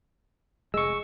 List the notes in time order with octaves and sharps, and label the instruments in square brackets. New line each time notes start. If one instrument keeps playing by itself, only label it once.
[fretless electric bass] F1 G#3 [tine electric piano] C#6 E6